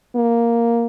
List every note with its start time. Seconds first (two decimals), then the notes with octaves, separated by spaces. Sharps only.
0.16 A#3